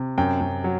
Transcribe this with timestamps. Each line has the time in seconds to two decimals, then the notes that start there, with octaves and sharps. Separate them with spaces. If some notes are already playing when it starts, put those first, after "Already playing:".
Already playing: C3
0.18 F#2 G5
0.41 F#2
0.64 F#3